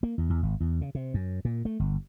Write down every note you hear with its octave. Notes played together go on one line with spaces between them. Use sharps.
A#3
E2
E2
G#1
E2
C#3
C3
F#2
A#2
A3
G1